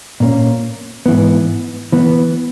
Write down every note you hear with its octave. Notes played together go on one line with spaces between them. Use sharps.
A#2 A#3 C#4
G#2 E3 B3
E3 B3